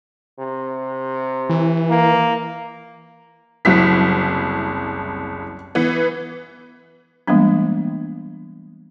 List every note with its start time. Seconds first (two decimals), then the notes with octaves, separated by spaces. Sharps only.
0.39 C3
1.50 E3
1.90 A#3
3.65 F#1 C2 F#3 E4 B6
5.75 E3 B3
7.28 E3 G3 G#3 A#3 B3 D4